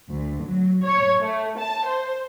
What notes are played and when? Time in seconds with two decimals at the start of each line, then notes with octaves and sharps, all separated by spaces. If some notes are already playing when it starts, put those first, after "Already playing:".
0.12 D2
0.45 F#3
0.86 C#5
1.22 A3
1.58 A5
1.87 C5